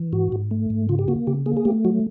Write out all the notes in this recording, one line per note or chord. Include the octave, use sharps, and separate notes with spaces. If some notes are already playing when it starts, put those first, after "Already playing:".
Already playing: E3
G#2 F#4
G#2
A3
G#2
C#3 F4
G4
A#3 F#4
C#3 G4
A#3 G#4
G#4
A3 G4
F#3 F#4